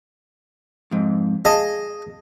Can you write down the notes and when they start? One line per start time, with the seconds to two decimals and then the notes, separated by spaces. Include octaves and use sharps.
0.91 F2 G#2
1.45 G#4 D#5 F5 A5